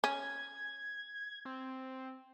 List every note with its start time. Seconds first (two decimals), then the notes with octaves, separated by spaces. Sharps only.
0.04 C#4 G#6
1.45 C4